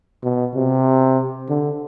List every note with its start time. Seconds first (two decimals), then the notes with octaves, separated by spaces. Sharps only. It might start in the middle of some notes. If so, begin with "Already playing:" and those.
0.23 B2
0.55 C3
1.49 D3